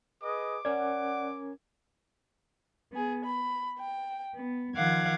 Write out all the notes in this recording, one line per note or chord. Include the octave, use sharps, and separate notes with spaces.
G#4 B4 D#5 D6
C#4 A#4 D5 F#5 G#6
B3 G#4
B5
G5
B3
D#3 F3 F5 F#5 D6 G#6